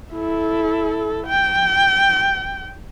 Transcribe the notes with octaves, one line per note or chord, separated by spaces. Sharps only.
E4 A4
G5